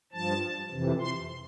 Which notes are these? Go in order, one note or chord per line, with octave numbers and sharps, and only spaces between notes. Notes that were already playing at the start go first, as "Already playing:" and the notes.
G2 F3 A5
F2 C3 E3
C6